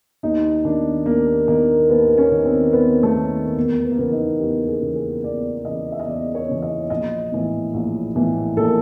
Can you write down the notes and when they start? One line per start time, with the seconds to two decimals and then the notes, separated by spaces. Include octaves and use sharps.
0.23 D#2 D#4
0.65 D#3 D4
1.06 D#2 A#3
1.48 D#3 A#3
1.90 D#2 B3
2.18 C#4
2.31 D#3
2.45 C4
2.73 D#2 B3
3.03 A3
3.15 D#3 A#3
3.56 E2 A#3
3.85 B3
3.92 A#3
3.98 C#3 E3 B3
4.12 D#4
4.40 E2 G4
4.68 G#4
4.81 C#3 E3
4.96 G#4
5.24 E2 D5
5.65 C#3 E3 D#5
5.92 E5
5.99 D#5
6.07 E2 D5
6.35 C#5
6.48 C#3 E3
6.62 D#5
6.90 A#1 D#5
7.32 A2 E3
7.74 A#1
8.16 A2 E3
8.57 A#1 A4
8.64 A#4